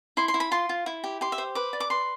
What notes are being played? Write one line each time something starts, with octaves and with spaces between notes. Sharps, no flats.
E4 C6
C6
E4
B5
F4 C6
F4
E4
G4
G4 C6
E5
C5
B4 D6
D5
D6
B4 C6